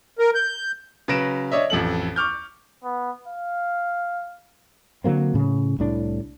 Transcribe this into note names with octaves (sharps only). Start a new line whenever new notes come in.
A#4
G6
C#3 F#3 B4 A#6 D7 E7
D4 C#5 D#5 E5
A1 F2 A4 F#7
C#6 D6 F6 G6
B3
F5
D3 F#3 A#3 C4
A2 C#3
C2 A2 D4